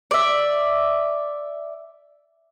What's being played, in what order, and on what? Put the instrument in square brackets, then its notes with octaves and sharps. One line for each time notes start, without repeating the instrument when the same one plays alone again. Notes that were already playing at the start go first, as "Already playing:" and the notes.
[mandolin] D5 E5